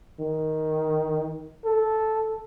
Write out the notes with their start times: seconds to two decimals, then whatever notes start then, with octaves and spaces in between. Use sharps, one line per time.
0.20 D#3
1.65 A4